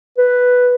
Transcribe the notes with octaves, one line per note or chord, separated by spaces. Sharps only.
B4